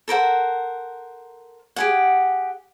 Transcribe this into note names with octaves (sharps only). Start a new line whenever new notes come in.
A4 A#4 C5 F#5
G4 G#4 F#5